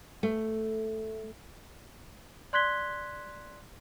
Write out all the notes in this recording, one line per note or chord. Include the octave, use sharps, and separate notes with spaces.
A3
D5 C6 F#6 G#6 B6 G7